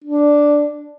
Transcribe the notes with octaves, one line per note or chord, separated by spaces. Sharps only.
D4